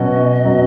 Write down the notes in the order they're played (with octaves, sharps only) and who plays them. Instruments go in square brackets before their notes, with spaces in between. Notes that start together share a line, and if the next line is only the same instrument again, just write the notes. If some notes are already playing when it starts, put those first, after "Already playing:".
Already playing: [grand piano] B2 F#3 C#4 F#4 [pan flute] D#5
[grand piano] B2 F#3 C#4 F#4